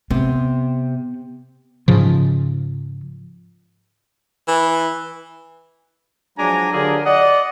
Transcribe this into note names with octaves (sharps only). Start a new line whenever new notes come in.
C3 B3
G#2 C#3 F3
E3
F3 F#3 G#3 D4 G#5 A#5
D3 F#3 F4 G4 G#4 A#4
D5 D#5 F#5